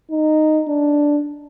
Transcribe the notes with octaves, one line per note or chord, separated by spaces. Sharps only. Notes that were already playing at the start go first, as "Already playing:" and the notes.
D#4
D4